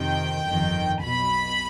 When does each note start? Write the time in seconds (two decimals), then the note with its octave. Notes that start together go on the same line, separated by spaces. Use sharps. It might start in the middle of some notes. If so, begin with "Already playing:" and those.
Already playing: F2 C3 D#3 G5
0.45 G1 F2 D#3
1.01 B1 B2 B5